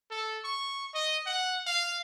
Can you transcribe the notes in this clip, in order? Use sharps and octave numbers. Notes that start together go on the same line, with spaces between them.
A4
C#6
D#5
F#5
F5